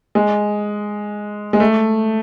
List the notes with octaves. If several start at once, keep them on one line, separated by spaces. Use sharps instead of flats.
G#3
G#3
A3